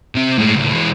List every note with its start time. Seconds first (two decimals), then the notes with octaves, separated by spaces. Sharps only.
0.15 C3 C4
0.38 A2 G#3
0.56 C#2 A2
0.74 E3 G#3